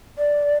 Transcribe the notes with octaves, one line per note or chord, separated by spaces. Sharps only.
D5